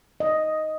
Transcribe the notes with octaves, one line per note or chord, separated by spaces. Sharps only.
D#5